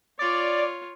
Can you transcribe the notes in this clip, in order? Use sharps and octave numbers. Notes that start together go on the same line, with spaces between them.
F4 C#5 D5